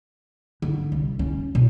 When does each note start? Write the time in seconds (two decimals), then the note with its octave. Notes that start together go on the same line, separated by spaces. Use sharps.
0.62 D3
0.92 C2
1.19 C#4
1.55 B2